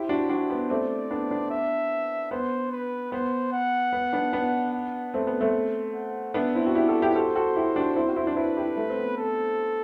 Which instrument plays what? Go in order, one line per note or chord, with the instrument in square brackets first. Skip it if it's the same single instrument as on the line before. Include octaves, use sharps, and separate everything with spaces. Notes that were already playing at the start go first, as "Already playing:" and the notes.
Already playing: [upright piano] E4 G4 [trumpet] C5
[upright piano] D4 F#4
D4 F#4
B3
[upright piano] A3 C4 [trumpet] D5
[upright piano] B3 D4
B3 D4
[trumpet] E5
[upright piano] B3 [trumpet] C5
[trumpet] B4
[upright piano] B3 [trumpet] C5
[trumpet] F#5
[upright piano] B3
B3 D4
B3 D4
[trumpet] F#5
[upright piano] A3 C4
B3
A3 C4
[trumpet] F#5
[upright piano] B3 D4 [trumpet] E5
[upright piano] C4 E4
F#4
[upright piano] E4 G4 [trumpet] D5
[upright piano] F#4 A4
E4 G4
[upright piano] F#4 A4 [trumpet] C5
[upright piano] F#4 A4
E4 G4
D4 F#4
C4 E4
F#4
C4 E4
D4
[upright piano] C4 E4 [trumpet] B4
[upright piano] E4 G4
A3
C4
B3
[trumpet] A4